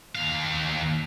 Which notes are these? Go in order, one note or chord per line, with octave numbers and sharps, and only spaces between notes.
D#2 F5